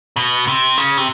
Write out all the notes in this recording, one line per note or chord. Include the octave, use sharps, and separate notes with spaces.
B2
C3
C#3
C3